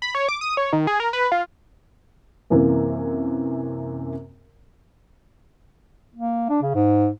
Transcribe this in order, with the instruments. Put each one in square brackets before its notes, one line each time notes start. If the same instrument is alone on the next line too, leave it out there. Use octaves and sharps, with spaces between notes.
[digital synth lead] B5
C#5
D6
D#6
C#5
D#3
G#4
A#4
B4
F4
[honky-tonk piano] F#2 C3 E3 A#3
[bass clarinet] A#3
D4
C#3
G#2